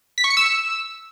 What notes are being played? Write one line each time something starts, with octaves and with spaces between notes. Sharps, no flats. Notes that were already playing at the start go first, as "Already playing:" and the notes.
B6
C#6
C#7
E6